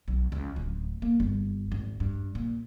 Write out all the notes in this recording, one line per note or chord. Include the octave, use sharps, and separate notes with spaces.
B1
C#2
D1
A#3
G1
G#1
G2
A#2